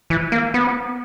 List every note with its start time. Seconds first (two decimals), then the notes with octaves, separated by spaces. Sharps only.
0.10 E3
0.32 A#3
0.54 B3